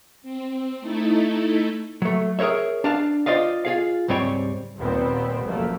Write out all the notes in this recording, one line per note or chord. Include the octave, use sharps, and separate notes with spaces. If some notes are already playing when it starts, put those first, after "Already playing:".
C4
A3 D#4 E4 A4
F#3 A3
G#4 A#4 C5 C#5 E5
D4 F5 A5
F4 C5 D5 D#5 F5
F4 G#4 F5
C#2 G#2 G3 C4 C#5 G5
D#2 A#2 G3 B3 C4
F#1 F2 F#3 G3 A3 A#3